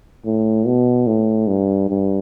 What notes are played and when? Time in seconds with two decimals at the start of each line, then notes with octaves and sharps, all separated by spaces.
0.26 A2
0.66 B2
1.07 A2
1.47 G2
1.90 G2